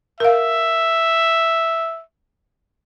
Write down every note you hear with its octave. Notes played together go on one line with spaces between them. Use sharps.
A#4 E5 F5